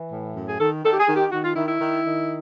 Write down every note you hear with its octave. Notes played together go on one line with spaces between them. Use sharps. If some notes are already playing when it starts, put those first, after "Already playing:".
Already playing: E3
A2
F#2
G#4
D#3 A4
D#3 A4
G4
G#4
D#3
G4
D#3 F#4
F4
D#3 E4
E4
D#3
D#3